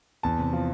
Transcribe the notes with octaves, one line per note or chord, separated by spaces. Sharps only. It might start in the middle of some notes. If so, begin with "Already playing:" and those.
E2 A5
C3
F3